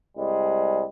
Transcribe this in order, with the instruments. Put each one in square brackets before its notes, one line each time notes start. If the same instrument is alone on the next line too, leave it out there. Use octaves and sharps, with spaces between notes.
[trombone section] C2 G3 G#3